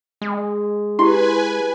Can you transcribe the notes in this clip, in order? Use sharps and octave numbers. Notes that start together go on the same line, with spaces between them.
G#3
E4 G4 B4 G#5 C6